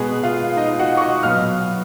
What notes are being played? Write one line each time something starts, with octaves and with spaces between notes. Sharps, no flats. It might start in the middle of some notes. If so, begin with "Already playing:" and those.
Already playing: B2 G#3 B3 G#4
F4 F5
D#4 D#5
F#4 F#5
C#6
D#5 D#6
B2 F#3 B3 F5 F6